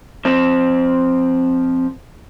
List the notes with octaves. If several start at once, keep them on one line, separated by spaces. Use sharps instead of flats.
F3 C4